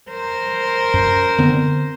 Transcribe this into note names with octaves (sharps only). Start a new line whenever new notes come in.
A#4 C5
F#2
D3 B3 C4